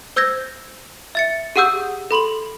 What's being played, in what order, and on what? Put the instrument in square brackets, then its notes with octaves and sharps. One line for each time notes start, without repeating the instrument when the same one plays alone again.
[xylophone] C5 E6 G6 G#6 A#6
E5 A6 C#7
G4 G#4 F#5 D#6 E6 G6
A4 B5 C6 F#7